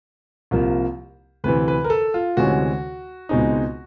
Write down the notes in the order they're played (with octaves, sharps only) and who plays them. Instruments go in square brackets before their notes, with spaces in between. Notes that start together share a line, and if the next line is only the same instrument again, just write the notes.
[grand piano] C2 C3 F3 A#3
D2 C3 E3 B4
B4
A#4
A4
F4
D2 C3 E3 G#3 C#4 F#4
C#2 B2 G#3 C4 D#4